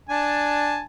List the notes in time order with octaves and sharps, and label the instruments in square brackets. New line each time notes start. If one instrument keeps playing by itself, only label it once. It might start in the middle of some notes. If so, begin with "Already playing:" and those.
[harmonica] D4 G#5 A5